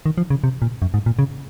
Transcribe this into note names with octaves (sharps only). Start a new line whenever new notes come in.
D#3
F3
C#3
C3
A#2
F#2
G#2
A#2
C#3